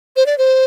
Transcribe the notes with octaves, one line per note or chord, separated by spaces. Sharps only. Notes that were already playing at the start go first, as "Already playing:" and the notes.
C5
D5
C5